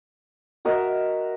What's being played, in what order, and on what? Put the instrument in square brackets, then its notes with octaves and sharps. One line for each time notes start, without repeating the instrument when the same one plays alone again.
[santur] F#4 A#4 D#5 E5